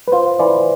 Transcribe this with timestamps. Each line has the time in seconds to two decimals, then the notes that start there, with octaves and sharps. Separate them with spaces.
0.08 B4
0.12 F4 C5
0.39 E3 D5